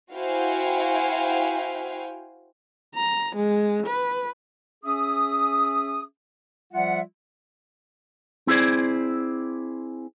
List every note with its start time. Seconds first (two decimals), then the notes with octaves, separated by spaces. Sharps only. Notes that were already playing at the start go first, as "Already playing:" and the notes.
0.13 E4 F#4 C5 F5 G5 G#5
2.95 A#5
3.36 G#3
3.87 B4
4.84 C#4 G#4 E5 D#6
6.73 F3 G3 F4 E5 F#5
8.47 C4 E4 G#4 C5 D5